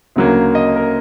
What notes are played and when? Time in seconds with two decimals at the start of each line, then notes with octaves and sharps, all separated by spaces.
0.16 D2 C#3 F#3 A#3
0.55 D#5
0.76 A#4